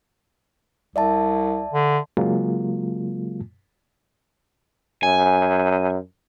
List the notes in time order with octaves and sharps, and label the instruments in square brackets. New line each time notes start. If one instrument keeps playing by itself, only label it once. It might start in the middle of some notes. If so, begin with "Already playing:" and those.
[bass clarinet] C2 [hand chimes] D5 E5 A5
[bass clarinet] D3
[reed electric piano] C#3 F#3 G#3 A#3 F4
[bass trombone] F#2 [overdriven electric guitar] G#5